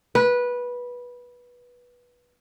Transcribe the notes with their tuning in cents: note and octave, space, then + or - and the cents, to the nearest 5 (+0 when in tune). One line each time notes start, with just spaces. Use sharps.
B4 -15